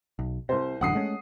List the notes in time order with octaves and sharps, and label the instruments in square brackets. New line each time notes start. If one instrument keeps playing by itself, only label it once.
[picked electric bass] B1
[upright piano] C2 C5 [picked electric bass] C3
[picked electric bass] A1 F#2 D3 [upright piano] F#5 D#6 C7
[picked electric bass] G#3 A3 C#4